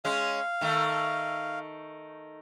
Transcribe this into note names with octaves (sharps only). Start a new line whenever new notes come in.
G#3 C#4 F5
D#3 A3